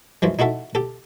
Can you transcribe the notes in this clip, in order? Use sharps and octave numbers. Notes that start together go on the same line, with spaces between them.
F#2 E3 F3 G#3
D#4 E4 F#4 A4 E5
G4 A4